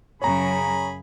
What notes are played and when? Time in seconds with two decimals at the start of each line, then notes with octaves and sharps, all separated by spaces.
0.22 F#2 C#3 G#4 C#5 A#5 B5